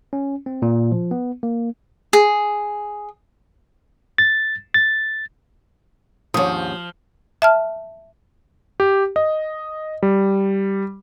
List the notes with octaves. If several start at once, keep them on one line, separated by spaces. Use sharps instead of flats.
C#4
C4
A#2
F3
B3
A#3
G#4
A6
A6
D#2 G#2 F3 C#4 D4 C#5 D#6
E5 A5 F6
G4
D#5
G3